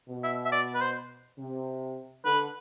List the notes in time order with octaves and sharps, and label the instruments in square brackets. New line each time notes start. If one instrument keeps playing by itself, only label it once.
[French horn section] B2
[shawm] E5
E5
D5
B4
C5
[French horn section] C3
[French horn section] D3 [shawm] B4